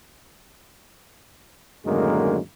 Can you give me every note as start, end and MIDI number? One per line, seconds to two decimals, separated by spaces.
1.85 2.38 42
1.85 2.38 45
1.85 2.38 50
1.85 2.38 51
1.85 2.38 56
1.85 2.38 58